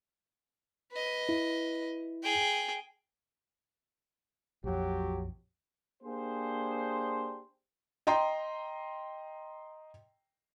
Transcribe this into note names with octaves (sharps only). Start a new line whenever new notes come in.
B4 D#5
E4
G#4 G5
A#1 F2 F#3 G4
A#3 D4 G4 G#4 C5
D#5 G5 A#5 C6